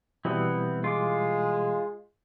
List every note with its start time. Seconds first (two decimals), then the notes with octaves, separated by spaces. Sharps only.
0.25 B2 E3 G3 B3 C4 E4
0.84 G#3 F4 D6